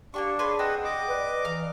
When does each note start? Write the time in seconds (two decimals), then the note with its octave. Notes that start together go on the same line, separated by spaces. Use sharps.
0.14 A#3 B3 D4 G4 C#6
0.39 G#4 B4 C#5 C6
0.59 C4 D#5 F#5
0.85 D#5 D6
1.09 B4 D5
1.45 E3 F5 A#5